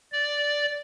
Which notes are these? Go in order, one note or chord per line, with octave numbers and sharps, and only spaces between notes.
D5